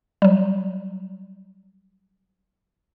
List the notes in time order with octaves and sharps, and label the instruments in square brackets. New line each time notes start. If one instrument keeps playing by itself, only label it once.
[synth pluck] F#3 G3